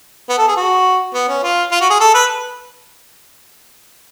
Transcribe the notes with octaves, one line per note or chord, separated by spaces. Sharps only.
B3
A4
G#4
F#4
B3
C#4
F4
F4
F#4
G#4
A4
B4